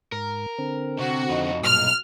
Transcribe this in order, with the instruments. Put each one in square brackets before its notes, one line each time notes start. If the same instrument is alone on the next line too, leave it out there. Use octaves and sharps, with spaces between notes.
[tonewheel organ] G#2 [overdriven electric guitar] A#4
[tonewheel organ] D3 C4
[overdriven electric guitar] C3 [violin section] F#4
[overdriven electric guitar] F2 D#4
[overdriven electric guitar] B1 [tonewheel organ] G2 A#2 [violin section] F6